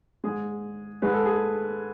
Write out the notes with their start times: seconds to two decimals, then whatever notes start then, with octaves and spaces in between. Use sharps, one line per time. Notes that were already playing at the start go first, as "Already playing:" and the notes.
0.24 G#2 G#3 G#4
1.02 G#2 G#3 B4
1.14 A4
1.25 G#4